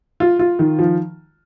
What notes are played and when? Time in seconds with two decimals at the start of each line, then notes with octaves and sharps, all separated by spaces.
0.20 F4
0.39 F4
0.59 D#3
0.79 F3